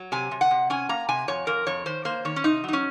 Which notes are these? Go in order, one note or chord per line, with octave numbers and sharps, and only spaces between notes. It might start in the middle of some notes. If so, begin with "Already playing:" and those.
Already playing: F#3
C3 G#5
C3
F#5
C3
C#4 G#5
A#3 A#5
C3 G#5
F2 C#5
F2 A#4
F2 C#5
D#3 C5
A#3 C5
D#3 C#5
C#4
C3 D#4
F#3 D#4
C#4